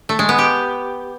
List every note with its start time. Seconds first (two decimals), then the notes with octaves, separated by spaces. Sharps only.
0.09 A3
0.19 G#3
0.29 B3
0.39 G4